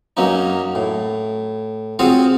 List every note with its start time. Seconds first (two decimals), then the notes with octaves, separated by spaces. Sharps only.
0.17 F#2 F#3 A#3 C#4 D#4
0.75 A2
1.99 C4 F4 F#4 G#4 C#5 F5